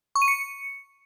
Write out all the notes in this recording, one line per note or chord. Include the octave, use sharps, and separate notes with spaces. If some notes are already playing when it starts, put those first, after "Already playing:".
C#6
D#7
C#7